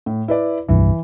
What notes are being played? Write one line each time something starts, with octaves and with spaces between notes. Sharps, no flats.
A2
E4 B4 D5
D#1 C2 G2 E3